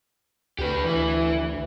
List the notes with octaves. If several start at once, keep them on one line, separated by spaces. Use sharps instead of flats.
D2 G4 B4
E3